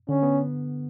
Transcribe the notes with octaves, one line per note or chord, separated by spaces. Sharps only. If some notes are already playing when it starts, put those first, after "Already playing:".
D3 C#4
B3